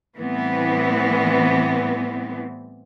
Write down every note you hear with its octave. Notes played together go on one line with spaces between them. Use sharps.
A2 E3 G3 B3 C4